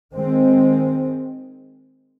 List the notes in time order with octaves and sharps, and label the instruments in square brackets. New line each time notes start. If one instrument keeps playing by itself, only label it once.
[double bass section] D#3 G#3 C4